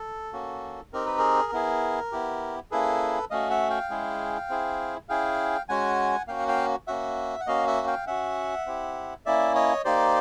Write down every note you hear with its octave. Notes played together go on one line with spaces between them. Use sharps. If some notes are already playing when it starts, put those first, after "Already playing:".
Already playing: A4
A#3 C#4 F#4
C4 D#4 G4 A#4
B4
G#4 A#4
B3 E4 G#4
B3 E4 G4
A#3 C#4 E4 G#4 A4 B4
A3 C#4 F#4 D#5 F5
E5 F#5
F5 G5
G#3 C#4 E4 G#4
C4 E4 G#4
C#4 E4 G#4 F5 G5
G#3 C#4 F#4 F#5 G#5
A#3 C#4 F#4 F5 G5
F#5
F5 G5
A#3 C#4 F#4 E5 F#5
F#5
A#3 C#4 F#4 D#5 F5
E5 F#5
F5 G5
C#4 F#4 E5 F#5
C4 E4 G4
A#3 C#4 E4 D5 E5
C#5 D#5
A#3 D#4 G4 C5 D5